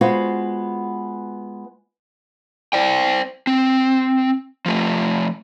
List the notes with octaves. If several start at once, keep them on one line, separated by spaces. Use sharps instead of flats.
G#3 B3 F4 F#4 B4 C5
C5 D5 G5
C4
F3 A3